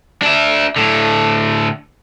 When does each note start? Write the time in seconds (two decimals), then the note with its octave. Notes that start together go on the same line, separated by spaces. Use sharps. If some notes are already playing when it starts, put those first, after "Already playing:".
0.22 D4 E5
0.76 A2 D3